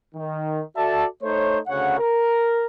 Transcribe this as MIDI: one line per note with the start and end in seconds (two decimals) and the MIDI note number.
0.15 0.61 51
0.76 1.05 66
0.76 1.05 69
0.76 1.05 74
0.76 1.05 76
0.76 1.05 81
1.23 1.57 57
1.23 1.57 63
1.23 1.57 72
1.23 1.57 73
1.67 1.98 38
1.67 1.98 49
1.67 1.98 73
1.67 1.98 78
1.99 2.65 70